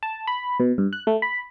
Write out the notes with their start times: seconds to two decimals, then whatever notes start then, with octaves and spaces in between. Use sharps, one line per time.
0.03 A5
0.27 B5
0.60 B2
0.78 G2
0.93 F#6
1.07 A3
1.22 B5